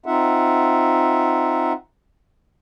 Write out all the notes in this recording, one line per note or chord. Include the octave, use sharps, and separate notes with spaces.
C4 D#4 F4 E5 F#5